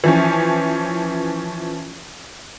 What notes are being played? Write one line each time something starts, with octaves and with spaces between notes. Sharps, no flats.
E3 F3 C#4